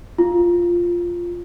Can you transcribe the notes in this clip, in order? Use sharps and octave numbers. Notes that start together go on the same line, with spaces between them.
F4